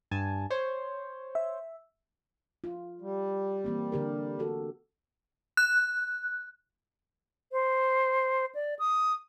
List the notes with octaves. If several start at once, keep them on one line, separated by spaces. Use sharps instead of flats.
G2 G#5 A5
C5 C#5
E5
F4
G3
E3 A#3 C4
D3 G4 A#4
F#4 A4
F#6
C5
D5
D#6